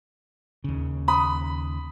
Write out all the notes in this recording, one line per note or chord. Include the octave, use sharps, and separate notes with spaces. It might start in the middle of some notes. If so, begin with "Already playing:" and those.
D#2 C#3
B5 D#6